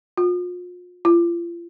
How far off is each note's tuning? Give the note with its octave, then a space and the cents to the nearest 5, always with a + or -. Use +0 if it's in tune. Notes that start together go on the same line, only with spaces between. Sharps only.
F4 +40
F4 -35